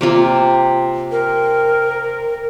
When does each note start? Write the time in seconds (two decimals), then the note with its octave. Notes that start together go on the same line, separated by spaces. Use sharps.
0.01 C3 A#3 F4
1.12 A#4